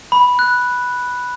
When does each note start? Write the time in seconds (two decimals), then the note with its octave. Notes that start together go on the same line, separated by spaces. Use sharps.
0.12 B5
0.39 F#6